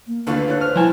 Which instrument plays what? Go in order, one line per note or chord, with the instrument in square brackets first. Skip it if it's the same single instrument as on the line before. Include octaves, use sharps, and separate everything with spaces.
[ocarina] A#3
[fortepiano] D2 D3 F4 [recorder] B4
[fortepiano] D3 F#6 [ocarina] C#5
[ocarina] C5 [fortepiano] F6
[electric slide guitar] F3 G#5 A5 [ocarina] E4